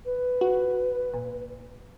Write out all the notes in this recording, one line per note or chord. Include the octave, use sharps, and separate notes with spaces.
B4
F#4
A#2